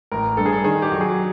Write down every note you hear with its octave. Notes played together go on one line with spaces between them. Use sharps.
A1 A#4
G2 A4
G#4
A4
D#3 G#4
G4
F#3
G#4